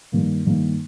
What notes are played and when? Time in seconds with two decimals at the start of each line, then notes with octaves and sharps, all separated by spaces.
0.12 G2 D#3 A#3
0.46 G2 D#3 A#3